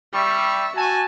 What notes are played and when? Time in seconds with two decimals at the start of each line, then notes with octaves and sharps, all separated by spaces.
0.14 G3 E5 C#6
0.77 F#4 G#5 A5